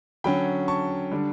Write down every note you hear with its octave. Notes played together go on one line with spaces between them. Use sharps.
D3 F#3 C#4 G5 B5
A5 C#6
D3 G3 D4